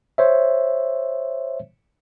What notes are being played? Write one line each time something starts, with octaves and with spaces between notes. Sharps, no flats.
C5 C#5 E5